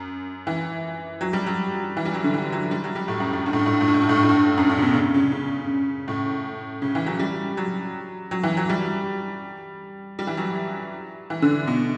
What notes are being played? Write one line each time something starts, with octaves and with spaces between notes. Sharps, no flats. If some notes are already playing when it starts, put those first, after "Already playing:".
Already playing: F#2
E3
F#3
G3
F#3
E3
G3
F#3
D3
E3
F#3
G3
F#3
G3
A2
F#2
F#2
G2
A2
G2
A2
G2
A2
G2
A2
G2
A2
G2
A2
G2
F#2
G2
C#3
B2
C#3
C#3
C#3
A2
C#3
E3
F#3
G3
F#3
F#3
E3
F#3
G3
G3
E3
F#3
E3
D3
B2